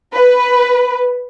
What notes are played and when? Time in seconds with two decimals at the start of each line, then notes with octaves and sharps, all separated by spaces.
0.14 B4